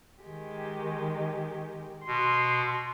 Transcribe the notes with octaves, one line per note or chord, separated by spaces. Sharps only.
D#3 G#3 G4
B2 C6